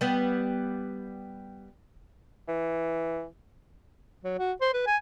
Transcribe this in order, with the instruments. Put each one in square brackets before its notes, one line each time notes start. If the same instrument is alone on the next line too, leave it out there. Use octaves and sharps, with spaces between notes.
[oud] G3 B3
[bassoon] E3
[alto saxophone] F#3
F#4
C5
B4
G#5